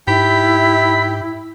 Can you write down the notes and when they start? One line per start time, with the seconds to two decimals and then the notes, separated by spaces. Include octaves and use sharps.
0.08 G#2 E4 G4 B5